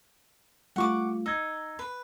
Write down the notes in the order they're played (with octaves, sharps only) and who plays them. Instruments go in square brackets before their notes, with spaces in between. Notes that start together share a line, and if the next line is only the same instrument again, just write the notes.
[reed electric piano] G3 A3 F4 [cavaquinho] F#5 C#6 D6
[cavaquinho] D#4 [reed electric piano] E6 G#6
[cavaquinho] B4